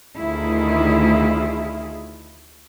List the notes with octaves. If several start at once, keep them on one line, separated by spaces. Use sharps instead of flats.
D2 D#3 A3 E4 F4 G#4